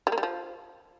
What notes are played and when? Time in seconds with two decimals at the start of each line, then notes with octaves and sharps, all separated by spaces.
0.07 G3
0.12 A#3
0.18 G3
0.23 F3